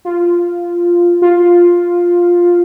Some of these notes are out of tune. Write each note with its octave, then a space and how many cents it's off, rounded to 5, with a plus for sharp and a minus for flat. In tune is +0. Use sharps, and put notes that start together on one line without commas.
F4 -5
F4 +5